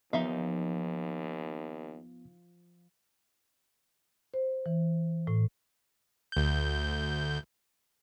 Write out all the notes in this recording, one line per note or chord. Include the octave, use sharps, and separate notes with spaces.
D#2 F3 B3 D#4 E5 F5
C5
E3
A2
D2 G6